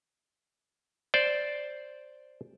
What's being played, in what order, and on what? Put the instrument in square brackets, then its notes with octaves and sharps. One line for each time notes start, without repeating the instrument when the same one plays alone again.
[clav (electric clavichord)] C5 D5